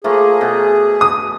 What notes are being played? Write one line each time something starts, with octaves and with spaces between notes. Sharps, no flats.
F3 A3 A#3 G#4
B2
D#6